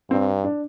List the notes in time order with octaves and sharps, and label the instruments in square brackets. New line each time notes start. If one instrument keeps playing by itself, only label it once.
[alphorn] G2 [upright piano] C4
[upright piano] D4